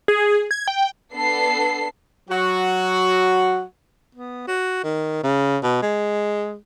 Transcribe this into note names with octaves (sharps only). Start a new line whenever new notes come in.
G#4
G#6
G5
B3 D4 A4 C7
F#3 F#4
B3
F#4
D#3
C#3
B2
G#3